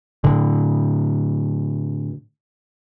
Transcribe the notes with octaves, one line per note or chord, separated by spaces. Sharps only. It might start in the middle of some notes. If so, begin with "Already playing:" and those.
A2 D3